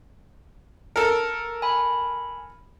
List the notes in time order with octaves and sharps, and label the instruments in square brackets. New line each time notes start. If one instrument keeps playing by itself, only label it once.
[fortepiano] A4 A#4
[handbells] G#5 B5